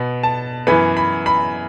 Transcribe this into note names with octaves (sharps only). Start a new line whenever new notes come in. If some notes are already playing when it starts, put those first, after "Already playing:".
Already playing: B2 B3
A5
F#2 E3 B3 B5
B5
B5